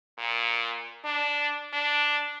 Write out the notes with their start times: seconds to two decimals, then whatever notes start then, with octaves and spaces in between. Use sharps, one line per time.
0.18 A#2
1.04 D4
1.72 D4